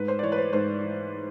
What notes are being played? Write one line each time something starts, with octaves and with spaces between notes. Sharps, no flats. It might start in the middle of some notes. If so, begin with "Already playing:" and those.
Already playing: G#2 B4
C5
D5
E3 C#5
B4
C5
G#2 C5
E3